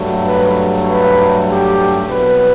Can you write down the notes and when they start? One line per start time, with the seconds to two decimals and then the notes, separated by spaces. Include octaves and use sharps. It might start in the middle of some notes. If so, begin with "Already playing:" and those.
Already playing: G2 F#3 A3
0.24 B4
0.85 B4
1.47 G4
2.08 C2 B2 F#3 B4